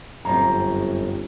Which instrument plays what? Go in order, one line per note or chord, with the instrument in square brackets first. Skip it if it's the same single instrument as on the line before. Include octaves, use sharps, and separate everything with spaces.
[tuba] G1 [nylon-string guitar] F#2 C4 [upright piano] A#5